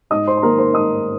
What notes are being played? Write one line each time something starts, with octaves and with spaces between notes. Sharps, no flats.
G#2 D#5 D#6
C5 C6
C6
D#3 A#3 A#4 A#5
C5 C6
G#2 D#5 D#6